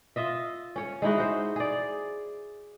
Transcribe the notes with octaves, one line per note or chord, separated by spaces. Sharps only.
F4 D#5 E5
C#4 C#5
G#3 D#4 E4 F#4
F#4 C5
G#4 D5